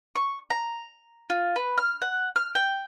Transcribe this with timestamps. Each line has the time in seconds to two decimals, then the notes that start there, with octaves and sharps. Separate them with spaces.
0.16 C#6
0.50 A#5
1.30 F4
1.56 B4
1.78 F6
2.02 F#5
2.36 F6
2.55 G5